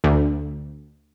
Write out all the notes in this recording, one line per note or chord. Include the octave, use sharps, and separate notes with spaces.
D2